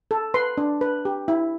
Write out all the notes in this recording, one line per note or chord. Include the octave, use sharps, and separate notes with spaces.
A4
B4 C6
D4
B4
G4
E4